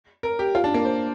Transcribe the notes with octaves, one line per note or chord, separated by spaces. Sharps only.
A#4
G4
F4
D4
A#3
C5